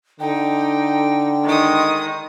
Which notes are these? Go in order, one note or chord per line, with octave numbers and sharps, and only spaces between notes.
D3 D#4 G5
D#3 G#3 D#6